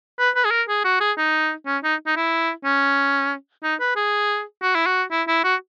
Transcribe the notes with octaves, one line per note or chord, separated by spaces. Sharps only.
B4
B4
G#4
A#4
G#4
F#4
G#4
D#4
C#4
D#4
D#4
E4
C#4
D#4
B4
G#4
F#4
E4
F#4
E4
E4
F#4